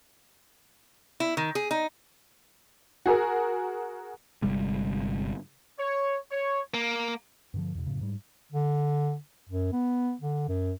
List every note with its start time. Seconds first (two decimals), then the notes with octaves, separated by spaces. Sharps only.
1.20 E4
1.37 D#3
1.55 G#4
1.71 D#4
3.06 F#4 G#4 A#4
4.42 G1 C3 G3 G#3
5.79 C#5
6.31 C#5
6.74 A#3
7.54 G2 D3 F3
7.75 E2 B2
7.86 F#2 A2 C#3
8.01 G#2 G3
8.52 D3
9.49 F#2
9.73 B3
10.21 D3
10.49 F#2